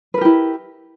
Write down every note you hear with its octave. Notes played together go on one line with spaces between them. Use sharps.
E4 G4 A#4 B4